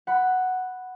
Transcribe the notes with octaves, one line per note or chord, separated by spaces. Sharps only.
F#5 B5